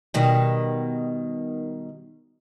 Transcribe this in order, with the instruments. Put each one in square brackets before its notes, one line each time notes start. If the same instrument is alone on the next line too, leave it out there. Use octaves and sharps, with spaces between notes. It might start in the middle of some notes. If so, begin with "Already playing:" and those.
[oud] B2 D#3 G3